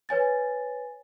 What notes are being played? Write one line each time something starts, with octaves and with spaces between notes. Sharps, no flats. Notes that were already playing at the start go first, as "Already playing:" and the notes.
B4 C#5 G#5 A6